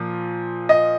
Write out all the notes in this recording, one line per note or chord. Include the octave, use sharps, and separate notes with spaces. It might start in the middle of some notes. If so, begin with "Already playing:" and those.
Already playing: A#2 F3
D#5